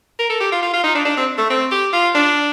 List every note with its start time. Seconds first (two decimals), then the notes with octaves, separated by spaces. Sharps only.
0.19 A#4
0.29 A4
0.40 G4
0.52 F4
0.62 F4
0.73 F4
0.83 D#4
0.95 D4
1.05 D4
1.17 C4
1.38 A3
1.50 C4
1.71 G4
1.93 F4
2.15 D4